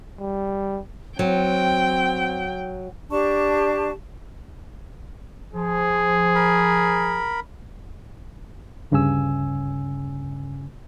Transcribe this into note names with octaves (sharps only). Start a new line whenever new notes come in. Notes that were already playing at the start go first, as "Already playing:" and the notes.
G3
F#3 C4 G5
D4 G4 A5 C#6
F3 G#4
A#4 B5
D2 G2 C#3 C#4 G#5 E6